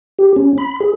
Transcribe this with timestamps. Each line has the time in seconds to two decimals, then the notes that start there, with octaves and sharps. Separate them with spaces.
0.19 G4
0.36 C#4
0.58 B5
0.80 G#4